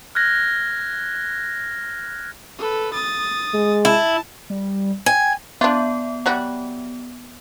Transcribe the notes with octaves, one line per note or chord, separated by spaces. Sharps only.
F6 F#6 G#6 A#6
A4 B4
D#6 A6
G#3
E4 A5
G3
G5 G#5
B3 D4 F4
F#3 G3 F#4